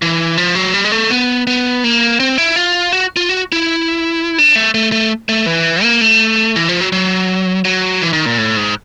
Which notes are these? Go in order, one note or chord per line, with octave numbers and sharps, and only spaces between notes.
E3
F3
F#3
G3
G#3
A3
B3
B3
A#3
C4
E4
F4
F#4
F4
F#4
E4
D4
A3
A3
A3
A3
E3
A#3
A3
E3
F3
F#3
F#3
F#3
E3
D#3
A#2
A2
G#2